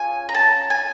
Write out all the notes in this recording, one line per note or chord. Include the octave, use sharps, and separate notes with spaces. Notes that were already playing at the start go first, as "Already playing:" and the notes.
Already playing: C#4 F4 G#4 G#5
A#5
A5
G#5